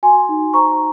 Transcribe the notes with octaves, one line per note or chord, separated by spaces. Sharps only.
F#4 G#5 C6
D#4
C5 A#5 C#6